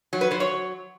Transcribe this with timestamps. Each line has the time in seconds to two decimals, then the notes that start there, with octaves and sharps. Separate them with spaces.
0.13 F#3
0.21 B4
0.31 F#3 C5
0.40 C#5